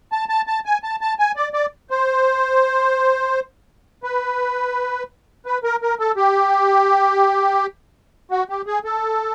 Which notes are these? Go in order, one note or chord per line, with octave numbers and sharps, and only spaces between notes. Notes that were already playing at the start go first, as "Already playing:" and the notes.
A5
A5
A5
G#5
A5
A5
G#5
D5
D5
C5
B4
B4
A#4
A#4
A4
G4
F#4
G4
G#4
A4